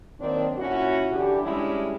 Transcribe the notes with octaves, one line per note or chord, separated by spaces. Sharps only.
D#3 F#3 A#3 C4 D4
A#2 C#4 E4 F#4
D3 E3 D4 G4
G3 G#3 C#4 D4 E4